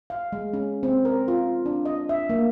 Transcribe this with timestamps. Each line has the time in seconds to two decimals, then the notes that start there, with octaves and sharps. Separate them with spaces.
0.10 F5
0.32 G#3
0.53 C#4
0.83 C4
1.05 A#4
1.28 F4
1.66 D4
1.85 D#5
2.09 E5
2.30 A#3